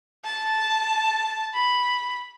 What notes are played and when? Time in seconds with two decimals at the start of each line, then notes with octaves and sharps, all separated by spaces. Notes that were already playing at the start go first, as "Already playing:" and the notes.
0.24 A5
1.54 B5